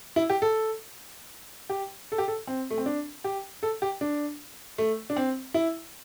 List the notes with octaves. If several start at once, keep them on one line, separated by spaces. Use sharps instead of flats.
E4
G4
A4
G4
A4
G4
A4
C4
A3
C4
D4
G4
A4
G4
D4
A3
D4
C4
E4